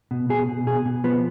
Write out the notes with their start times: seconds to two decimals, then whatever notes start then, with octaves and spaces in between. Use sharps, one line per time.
0.11 B2
0.30 B2 G#4
0.48 B2
0.67 B2 G#4
0.86 B2
1.04 F3 B3